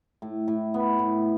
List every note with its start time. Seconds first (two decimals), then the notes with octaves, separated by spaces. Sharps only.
0.22 A2
0.48 A2
0.74 B3
0.99 A2